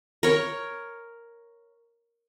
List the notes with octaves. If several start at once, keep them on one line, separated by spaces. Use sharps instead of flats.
A#4 C#5